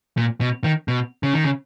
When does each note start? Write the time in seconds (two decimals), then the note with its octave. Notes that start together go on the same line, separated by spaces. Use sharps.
0.17 A#2
0.41 B2
0.64 D#3
0.88 B2
1.23 C#3
1.34 D#3
1.44 C#3